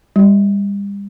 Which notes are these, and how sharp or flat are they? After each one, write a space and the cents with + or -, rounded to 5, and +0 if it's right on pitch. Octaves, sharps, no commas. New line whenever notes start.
G3 +35